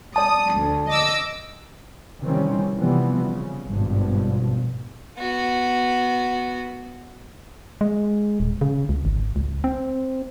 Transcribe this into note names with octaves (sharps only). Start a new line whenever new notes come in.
D5 A5 D#6
D2
D#5 D6 E6
C3 D#3 E3 G3 C4 C#4
C3 E3 F3 G3 B3 C4
C#3
G#1 G2 B2 F3
B3 F#4
G#3
D#1
C#3
C#2
G#1
C#2
C4